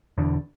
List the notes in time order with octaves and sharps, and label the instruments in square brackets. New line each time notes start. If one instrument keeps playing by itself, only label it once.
[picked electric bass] E1 E2 D3